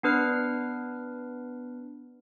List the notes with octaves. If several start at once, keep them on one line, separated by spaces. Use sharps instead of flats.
B3 D4 B4 F6 C7